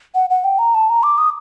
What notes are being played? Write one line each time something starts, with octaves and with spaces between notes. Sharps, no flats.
F#5
F#5
G5
A#5
A5
A#5
D6
D#6